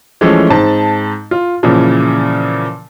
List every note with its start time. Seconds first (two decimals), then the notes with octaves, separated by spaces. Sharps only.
0.21 E3 F3 G#3 A3 C#4
0.50 G#2 C4 A5
1.31 F4
1.63 A#2 C#3 E3 F3